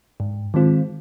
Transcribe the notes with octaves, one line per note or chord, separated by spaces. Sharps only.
G#2
D#3 G#3 C4 F4